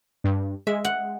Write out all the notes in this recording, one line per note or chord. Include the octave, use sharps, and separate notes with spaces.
G2
G#3 E5
F#5